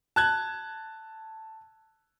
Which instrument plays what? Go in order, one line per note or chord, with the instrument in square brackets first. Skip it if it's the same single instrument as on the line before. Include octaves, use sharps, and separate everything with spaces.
[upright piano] A5 F#6 G#6